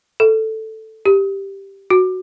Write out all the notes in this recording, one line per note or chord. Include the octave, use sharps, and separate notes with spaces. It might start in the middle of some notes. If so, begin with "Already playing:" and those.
A4
G4
F#4